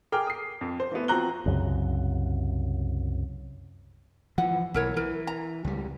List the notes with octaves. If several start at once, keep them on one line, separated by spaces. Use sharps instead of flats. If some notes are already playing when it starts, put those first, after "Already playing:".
G#4 A#4 G5 G#5 D6 F6
D#6 C7
F2
C5
E3 A3 B3
F3 C4 F#4 A#5 F#6 G7
C2 F#2 C#3
E3 F3 F#5
B1 E3 E4 A#4 C#5
E3 A#4 B4
A#5
C#2 G3